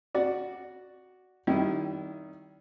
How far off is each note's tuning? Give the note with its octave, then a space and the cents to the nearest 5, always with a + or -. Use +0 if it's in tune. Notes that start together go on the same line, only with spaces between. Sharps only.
F#4 +0 D5 +0
D#3 +0 G3 -35 E4 +0